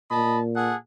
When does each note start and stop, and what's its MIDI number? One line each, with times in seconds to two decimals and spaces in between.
0.11 0.73 46
0.11 0.40 75
0.11 0.40 81
0.11 0.40 83
0.56 0.76 68
0.56 0.76 69
0.56 0.76 78